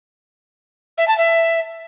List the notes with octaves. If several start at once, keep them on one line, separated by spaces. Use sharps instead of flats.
E5
A5
E5